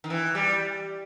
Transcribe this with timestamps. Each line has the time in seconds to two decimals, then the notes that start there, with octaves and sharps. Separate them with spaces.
0.04 D#3
0.10 E3
0.35 G3